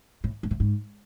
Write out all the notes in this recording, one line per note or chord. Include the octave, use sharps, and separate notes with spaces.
A2
G#2
A2
G#2